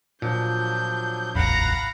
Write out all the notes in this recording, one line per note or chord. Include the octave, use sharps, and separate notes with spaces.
A#2 F3 F#3 D4 G6
D1 A1 E2 F5 F#5 A#5 B5